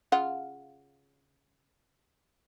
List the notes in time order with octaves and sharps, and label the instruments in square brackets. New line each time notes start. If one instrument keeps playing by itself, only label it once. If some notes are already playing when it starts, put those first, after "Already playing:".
[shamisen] C#3 F4 F#5